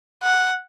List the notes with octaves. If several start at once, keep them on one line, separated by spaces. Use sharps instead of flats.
F#5